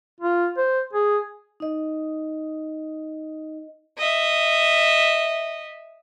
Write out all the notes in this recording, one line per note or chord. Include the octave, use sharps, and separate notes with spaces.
F4
C5
G#4
D#4 D#5
D#5 E5